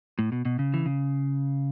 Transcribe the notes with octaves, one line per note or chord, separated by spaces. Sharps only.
A2
B2
B2
C#3
E3
C#3